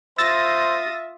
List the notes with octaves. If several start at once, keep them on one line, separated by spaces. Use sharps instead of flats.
F4 C5 E5 D#6 E6 A6 A#6